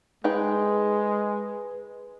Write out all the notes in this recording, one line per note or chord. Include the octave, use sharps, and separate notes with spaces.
G#3 D#4 G#4 B4 G5